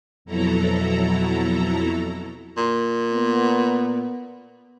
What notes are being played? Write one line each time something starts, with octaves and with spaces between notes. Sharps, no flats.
F2 B2 F#3 E4 A4 A#5
A#2
B3